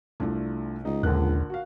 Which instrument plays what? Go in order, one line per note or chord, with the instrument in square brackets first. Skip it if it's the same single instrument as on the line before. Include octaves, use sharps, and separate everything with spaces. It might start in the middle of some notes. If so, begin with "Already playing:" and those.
[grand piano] C2 [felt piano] A3 D4 F4
[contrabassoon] C#2 [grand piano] D#4
[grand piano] A#1 D3 F#6 [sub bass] D#2 [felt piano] A#4 F#5
[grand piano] F#4 F5